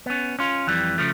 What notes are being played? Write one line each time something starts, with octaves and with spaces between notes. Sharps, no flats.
B3 C#4
C#4 F4
F2 E3 G3
C#3 F3 A3